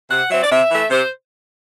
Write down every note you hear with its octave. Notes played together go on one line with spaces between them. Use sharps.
C3 F#5
F#3 C4 E5
D5
C3 E5
E3 A3
C3 C5